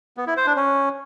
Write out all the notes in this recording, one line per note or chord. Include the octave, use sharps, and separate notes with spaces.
B3
E4
C5
D4
C#4